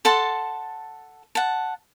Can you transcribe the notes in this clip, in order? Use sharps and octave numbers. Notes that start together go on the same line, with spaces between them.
A4 F#5 A5 C6
F#5 A5